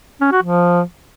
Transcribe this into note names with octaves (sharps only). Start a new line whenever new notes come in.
C#4
F#4
F3